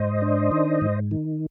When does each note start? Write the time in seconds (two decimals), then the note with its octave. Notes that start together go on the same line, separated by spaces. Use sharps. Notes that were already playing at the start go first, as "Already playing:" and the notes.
Already playing: G#2 C5 D#5
0.22 D4
0.52 D#3
0.81 G#2
1.11 D#3